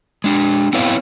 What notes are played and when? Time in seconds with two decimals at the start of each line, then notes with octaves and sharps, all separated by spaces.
0.24 G#3 D4
0.73 B3 C4 E4 B4 C#5 F5